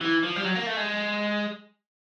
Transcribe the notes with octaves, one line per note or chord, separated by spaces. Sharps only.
E3
F3
G3
F#3
A#3
A3
G#3